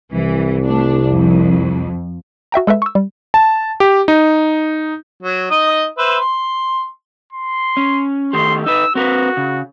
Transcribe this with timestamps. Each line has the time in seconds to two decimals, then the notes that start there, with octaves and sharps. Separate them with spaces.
0.12 C2 E3
0.64 A3 D4
1.09 F2
2.52 F#4 E5 G5 A#5
2.67 G#3 A4 B4 E5
2.82 C#6 E6
2.95 G3
3.34 A5
3.80 G4
4.08 D#4
5.23 F#3
5.51 D#4 D#5 D#6
5.98 B4 C5 E5
6.21 C6
7.33 C6
7.77 C#4
8.33 D#3 A3 G4 C6
8.66 D#4 B4 E6
8.95 C4 F#4 A#4 B4
9.37 C#3